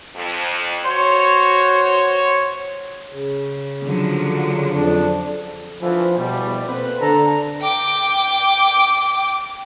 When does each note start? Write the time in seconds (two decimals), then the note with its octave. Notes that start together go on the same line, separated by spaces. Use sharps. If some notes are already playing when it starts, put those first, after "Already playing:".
0.15 F2
0.85 F#4 C5 C#5
3.11 C#3
3.82 D3 F3 F#3
4.71 F2 D4
5.81 D2 D3 E3 F3
6.17 E2 B2 G3
6.66 A#3 C4 A4 B4
7.01 D3 A4 A#5
7.62 G5 D6